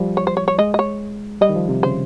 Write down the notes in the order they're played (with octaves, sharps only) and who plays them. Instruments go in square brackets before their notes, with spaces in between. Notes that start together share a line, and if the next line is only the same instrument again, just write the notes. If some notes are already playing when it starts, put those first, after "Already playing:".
Already playing: [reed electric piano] F3 G3
[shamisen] C#5
C5
C#5
C#5
[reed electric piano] G#3 [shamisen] D#5
[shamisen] D#5
C#5
[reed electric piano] G3 [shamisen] D#5
[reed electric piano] D#3
F3
C3
[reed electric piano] C#3 [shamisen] C5